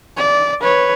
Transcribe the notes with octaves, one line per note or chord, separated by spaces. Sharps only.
D5
B4 C#5